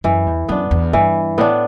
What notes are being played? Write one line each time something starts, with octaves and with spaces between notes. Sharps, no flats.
F#2 E3
E2
F#2 B3 D4
E2
G2 E3
A2 B3 D4